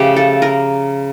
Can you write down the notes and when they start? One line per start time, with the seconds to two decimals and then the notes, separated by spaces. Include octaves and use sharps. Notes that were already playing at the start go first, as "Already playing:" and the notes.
Already playing: C#3 F3 A3 G4
0.16 A4
0.42 A#4